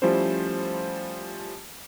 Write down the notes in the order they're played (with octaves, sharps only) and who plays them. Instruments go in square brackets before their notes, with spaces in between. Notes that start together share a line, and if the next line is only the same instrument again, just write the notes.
[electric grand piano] F3 G3 A3 C#4 E4 C5